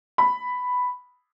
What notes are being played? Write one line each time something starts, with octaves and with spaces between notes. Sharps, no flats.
B5